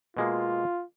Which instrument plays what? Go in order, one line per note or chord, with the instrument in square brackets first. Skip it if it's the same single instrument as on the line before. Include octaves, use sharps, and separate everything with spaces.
[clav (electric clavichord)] B2 G#3 A#3 [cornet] F4